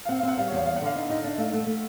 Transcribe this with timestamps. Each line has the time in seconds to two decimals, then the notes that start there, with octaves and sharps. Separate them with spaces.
0.05 F5
0.08 C4 F#5
0.19 F5
0.23 C4
0.28 F#5
0.38 G3 F5
0.48 C#5
0.52 E2 F5
0.66 B3 F5
0.76 F#5
0.81 D3 F5
0.95 D#4
1.10 D#4 D#5
1.24 D4 E5
1.38 A3 F5
1.53 A3 F#5
1.67 A3